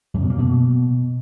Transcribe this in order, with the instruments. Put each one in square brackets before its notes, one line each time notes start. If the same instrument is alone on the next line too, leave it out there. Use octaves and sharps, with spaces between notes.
[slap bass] F#2
B2
A#3
B2